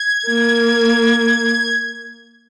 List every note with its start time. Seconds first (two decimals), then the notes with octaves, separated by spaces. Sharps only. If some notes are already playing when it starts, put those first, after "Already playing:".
Already playing: G#6
0.28 A#3